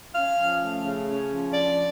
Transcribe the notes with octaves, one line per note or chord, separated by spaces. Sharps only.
C#4 F5
F3
A3
C#3
C#4
F3
D4 D5